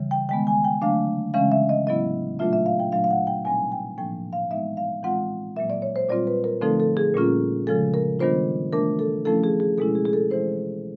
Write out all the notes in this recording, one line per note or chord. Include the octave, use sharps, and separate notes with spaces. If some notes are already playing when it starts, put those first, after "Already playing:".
Already playing: C#3 E3 G3
G5
D#3 G#3 B3 G5
G#5
G5
D3 F#3 A3 D4 F5
C#3 E3 G#3 C#4 F5
E5
D#5
A2 F#3 B3 E4 D#5
A#2 F#3 A3 D4 F4 E5
E5
F5
G5
A#2 F#3 A3 D4 F5
F5
F#5
G5
B2 G3 C4 D#4 G#5
G5
A2 F3 A#3 D4 G5
F5
E3 G#3 B3 D#4 E5
F5
A2 E3 G#3 C4 F4 F#5
A#2 F#3 A#3 E5
D5
C#5
C5
A#2 G3 C4 F4 D5
B4
A#4
D3 F3 A3 C4 D#4 A4
A4
G#4
A#2 G3 A#3 C#4 F4
C#3 F3 G#3 A4
A#4
D#3 G3 B3 D4 F4 C5
E3 A3 D4 A#4
A4
F3 A3 C#4 E4 A4
G#4
G#4
B2 G#3 C#4 E4 A4
G#4
G#4
A4
E3 G#3 C4 E4 C5